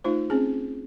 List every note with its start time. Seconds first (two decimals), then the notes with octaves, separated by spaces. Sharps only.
0.04 A3 D#4 F4 C5
0.30 C4 C#4 G#4